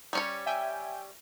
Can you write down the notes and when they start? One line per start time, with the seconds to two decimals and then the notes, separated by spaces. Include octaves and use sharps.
0.13 G3 C#4 C#5
0.46 E5 G5 G#5